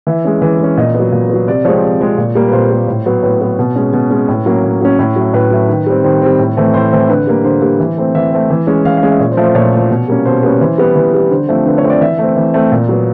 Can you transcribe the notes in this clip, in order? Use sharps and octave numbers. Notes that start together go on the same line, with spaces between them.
E3 E5
G#3 C#4
E3
G#3 C#4
A#2 D#5
B3
F#3
A#2
F#3 B3
C3 D5
F3 G#3 C4 C#5
C3
F3 G#3 C4
A#2
G3 A#3
B4
A#2 C5
G3 A#3
A2
F#3 B3
A2 B4
F#3 B3
B2
G#3 C#4
B2 B4
G#3 C#4
A2
F#3 A#3 C#4
A2
F#3 A#3 C#4
A2
F#3 A3
A2 B4
F#3 A3
D#3
G3 C4
D#3 C5
G3 C4
A2
E3 A3 C4
A2 C5
E3 A3 C4
D3 B4
G3 A#3
D3 C5
G3 A#3
E3
A3 C4
E3 E5
A3 C4
E3
G#3 C#4
E3 F5
F5
G#3 C#4
E5
A#2 C#5
C5
F3 A3
C5
A#2 C#5
F3 A3
B2
G3 A#3 C#4
B2 C5
G3 A#3 C#4 B4
E3 C5
G3 B3
E3
G3 B3
D3 C5
F3 A3 C4
D3 B4
C#5
F3 A3 C4
D5
E3 E5
A3 C4
E3
A3 C4
A#2
F#3 B3